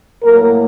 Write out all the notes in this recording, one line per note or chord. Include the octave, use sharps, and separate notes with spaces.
A2 F#3 A#3 A#4